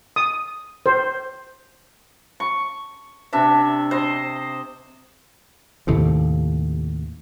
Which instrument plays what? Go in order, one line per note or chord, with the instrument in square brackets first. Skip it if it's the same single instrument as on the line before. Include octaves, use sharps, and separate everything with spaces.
[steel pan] D#6
C5
[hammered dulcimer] C#6
C3 D4 E5
C5 D#5
[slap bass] D#2 A2 C3